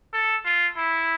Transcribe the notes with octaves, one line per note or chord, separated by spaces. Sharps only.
A4
F4
E4